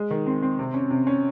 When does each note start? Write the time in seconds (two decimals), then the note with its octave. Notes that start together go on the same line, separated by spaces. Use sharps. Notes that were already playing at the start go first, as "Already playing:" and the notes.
Already playing: G#3
0.10 D#3
0.26 C4
0.43 C4
0.59 C3
0.74 C#4
0.91 C3
1.07 C#4